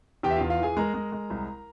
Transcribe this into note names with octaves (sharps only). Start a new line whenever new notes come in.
E2 G4 G5
E5
E2 F4 F5
F4 F5
E3 G#4 G#5
G#3 A#4 A#5
G#3
G#3
C2